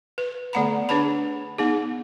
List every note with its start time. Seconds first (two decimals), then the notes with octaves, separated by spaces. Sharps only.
0.18 B4
0.53 D3 A3 B3 F#5 A#5 B5
0.89 D4 G#4 B4 C#5 A5 B5
1.58 B3 D#4 G#4